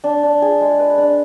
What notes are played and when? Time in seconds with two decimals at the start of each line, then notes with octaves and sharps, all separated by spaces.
0.04 D4
0.23 D4
0.42 G#4
0.61 G#3
0.79 B4
0.98 D4